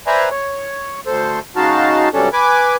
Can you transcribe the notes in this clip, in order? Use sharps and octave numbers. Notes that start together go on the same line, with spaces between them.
B4 C5 D5 E5 G#5 A#5
C#5
D2 A4 C5
C#3 G#3 D#4 F#4 F5 A5
G2 C3 F#3 C#4 D4 A4
B4 G#5 D6